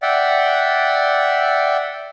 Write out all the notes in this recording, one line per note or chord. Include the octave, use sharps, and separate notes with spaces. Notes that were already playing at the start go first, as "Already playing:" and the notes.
D5 E5 F#5 G5